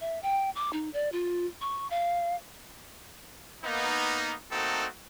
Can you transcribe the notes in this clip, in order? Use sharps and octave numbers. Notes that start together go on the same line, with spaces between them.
E5
G5
D6
D#4
D5
F4
C#6
F5
A#3 B3 D#4
A3 A#3 C4 D#4 F#4 A4